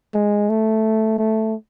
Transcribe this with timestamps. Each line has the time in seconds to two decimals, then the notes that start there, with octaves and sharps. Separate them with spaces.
0.14 G#3
0.50 A3
1.18 A3